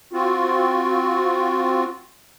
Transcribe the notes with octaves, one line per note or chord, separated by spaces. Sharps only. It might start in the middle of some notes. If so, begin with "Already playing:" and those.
C4 F4 F#4